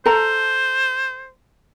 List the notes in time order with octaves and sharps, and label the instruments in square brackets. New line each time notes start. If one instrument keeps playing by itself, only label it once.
[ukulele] A4 A#5 [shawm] C5